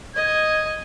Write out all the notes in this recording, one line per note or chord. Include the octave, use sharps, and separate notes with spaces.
D#5 G#6